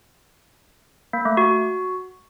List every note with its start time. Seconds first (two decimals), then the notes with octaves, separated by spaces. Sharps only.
1.13 A#3
1.25 A3
1.37 F#4